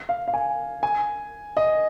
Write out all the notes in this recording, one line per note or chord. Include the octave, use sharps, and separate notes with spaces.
F5
F5
G#5
G#5
D#5